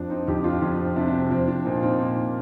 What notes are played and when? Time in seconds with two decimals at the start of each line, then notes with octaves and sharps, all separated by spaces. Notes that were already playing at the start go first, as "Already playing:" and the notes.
Already playing: F2 F3 D4
0.10 C4 D#4
0.27 F2 D#4 G4
0.44 D4 F4
0.61 F2 D4 F4
0.78 C4
0.96 C3 D4
1.07 D4
1.14 C4
1.30 F3 C4
1.47 D4
1.65 A#2 C4 D#4
1.77 F4
1.83 C4 D#4
2.00 A#2